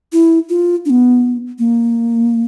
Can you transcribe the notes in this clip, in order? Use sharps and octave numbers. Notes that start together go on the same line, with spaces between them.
E4
F4
D4
B3
A#3